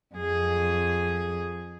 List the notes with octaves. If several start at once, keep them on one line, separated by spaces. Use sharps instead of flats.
F2 G#4